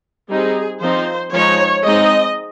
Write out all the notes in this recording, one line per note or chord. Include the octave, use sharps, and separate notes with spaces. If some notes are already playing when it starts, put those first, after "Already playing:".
G3 C4 D#4 G#4
F3 C4 D#4 C5
F3 G#3 D#4 C#5
G#3 C4 D#4 D#5